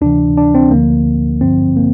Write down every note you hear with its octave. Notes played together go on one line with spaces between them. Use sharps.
D2 C3 E3 D4
D4
C4
D2 D3 F3 A#3
A1 G2 D3 F3 C4
A#3